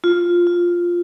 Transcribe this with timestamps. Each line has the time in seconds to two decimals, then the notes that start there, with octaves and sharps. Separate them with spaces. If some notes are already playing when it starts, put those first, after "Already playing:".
0.04 F4
0.47 F4